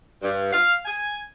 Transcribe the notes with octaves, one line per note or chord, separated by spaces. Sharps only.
G2
F5
G#5